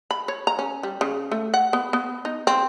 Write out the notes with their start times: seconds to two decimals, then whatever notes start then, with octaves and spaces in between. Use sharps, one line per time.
0.11 B5
0.28 C#5
0.47 A#5
0.59 C#4
0.83 G3
1.01 C#3
1.32 A3
1.54 F#5
1.73 B3
1.93 B3
2.25 D#4
2.47 C4